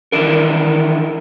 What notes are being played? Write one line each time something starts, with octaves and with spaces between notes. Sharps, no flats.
D#3 E3 D4 E4 A#4